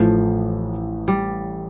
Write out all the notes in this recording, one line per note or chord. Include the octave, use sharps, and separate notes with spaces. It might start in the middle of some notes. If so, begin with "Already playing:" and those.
Already playing: A1 A2 E3 F3 A3
G3